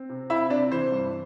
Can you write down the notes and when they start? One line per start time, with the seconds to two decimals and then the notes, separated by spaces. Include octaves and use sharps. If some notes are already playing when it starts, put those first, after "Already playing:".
Already playing: C4
0.09 C3
0.30 C4 E4 E5
0.50 C3 D4 D5
0.71 E3 C5
0.92 G2